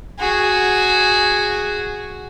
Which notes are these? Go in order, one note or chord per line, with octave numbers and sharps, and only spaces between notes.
F#4 G#4